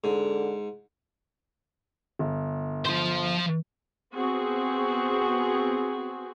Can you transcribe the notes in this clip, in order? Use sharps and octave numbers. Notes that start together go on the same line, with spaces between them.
G#2 D3
G1
F3 C5
B3 C4 F#4 G#4